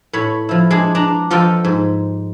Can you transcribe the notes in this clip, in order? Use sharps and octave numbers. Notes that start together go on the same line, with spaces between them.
A2 C#5 B5
F3 E4
G#3 D4 G#4
D4 A#5
F3 F4 A4 D#5 G5
G#2